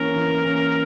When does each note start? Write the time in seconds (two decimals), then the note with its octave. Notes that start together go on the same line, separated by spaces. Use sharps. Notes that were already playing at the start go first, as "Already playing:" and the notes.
Already playing: E3 A#3 C#4 A#4
0.16 E3
0.43 A#3 C#4